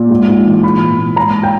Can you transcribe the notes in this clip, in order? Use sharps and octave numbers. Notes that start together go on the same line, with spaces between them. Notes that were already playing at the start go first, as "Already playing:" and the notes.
Already playing: A#2
G#2
G#2
E3
A#2 B5
A#2
A#2
G#2 A#5
G5